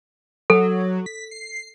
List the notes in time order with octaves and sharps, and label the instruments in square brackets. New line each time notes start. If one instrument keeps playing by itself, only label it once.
[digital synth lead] F#3 [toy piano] A4
[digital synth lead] B6
C7